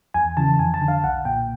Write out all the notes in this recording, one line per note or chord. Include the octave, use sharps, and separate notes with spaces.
E2 G#5
C#3 E3 A5
F2 G#5
A5
D3
F5
B1 F#5
A#2 G5